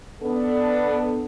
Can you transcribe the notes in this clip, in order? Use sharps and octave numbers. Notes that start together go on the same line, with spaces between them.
B3 D4 A4